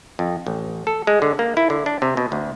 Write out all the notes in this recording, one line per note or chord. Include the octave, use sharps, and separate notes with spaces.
F2
A1
A4
G#3
D3
A#3
E4
D3
D4
C3
B2
D2